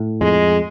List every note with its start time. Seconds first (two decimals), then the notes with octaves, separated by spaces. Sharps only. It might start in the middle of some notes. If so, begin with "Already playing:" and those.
Already playing: A2
0.21 F2 G#3